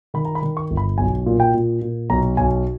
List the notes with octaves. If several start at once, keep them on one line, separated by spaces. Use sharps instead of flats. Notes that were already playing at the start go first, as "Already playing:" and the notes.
D#3 B5
A#5
B5
D#3
C#6
G1
B5
B1 G#5
A#2
G5
A#2
A#2
B1 A#5
B1 G#5